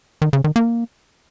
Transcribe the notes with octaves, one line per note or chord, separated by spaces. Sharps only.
D#3
C#3
D#3
A#3